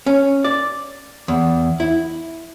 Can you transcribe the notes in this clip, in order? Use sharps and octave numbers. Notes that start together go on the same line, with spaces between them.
C#4
D5
E2
E4